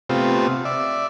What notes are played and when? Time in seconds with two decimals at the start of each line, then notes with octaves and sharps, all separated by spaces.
0.09 C3 A3 B3 C4 F4 G4
0.65 D5 E5